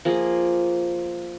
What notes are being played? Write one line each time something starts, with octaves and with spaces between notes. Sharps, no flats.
F3 A#3 G#4